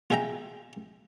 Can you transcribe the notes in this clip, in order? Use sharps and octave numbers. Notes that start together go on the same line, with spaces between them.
F4 G#4 E5 G5 A#5